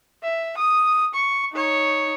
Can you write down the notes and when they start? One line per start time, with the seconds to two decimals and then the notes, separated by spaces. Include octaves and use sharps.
0.23 E5
0.57 D#6
1.14 C#6
1.52 D#4 C#5